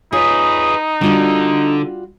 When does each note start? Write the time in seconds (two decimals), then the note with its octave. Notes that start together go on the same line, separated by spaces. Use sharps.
0.13 D#4 F4 G#4 B4 C#5 D#6
1.01 D3 G3 D4 F4 F#4